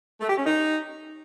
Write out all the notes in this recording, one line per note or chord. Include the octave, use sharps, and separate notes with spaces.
A3
G4
C#4
D#4